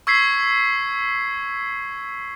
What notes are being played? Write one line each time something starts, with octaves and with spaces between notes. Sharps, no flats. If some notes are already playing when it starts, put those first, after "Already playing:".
C#6 E6 G#6 B6 C7